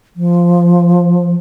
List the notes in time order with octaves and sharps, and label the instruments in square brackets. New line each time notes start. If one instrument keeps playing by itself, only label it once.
[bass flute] F3